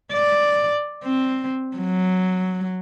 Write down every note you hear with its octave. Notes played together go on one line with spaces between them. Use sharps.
D5
C4
F#3